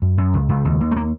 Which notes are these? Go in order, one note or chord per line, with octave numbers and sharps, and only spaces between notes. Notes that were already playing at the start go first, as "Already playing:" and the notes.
F#2
F#2
C#2
C#2
D#2
D#2
A3
A#3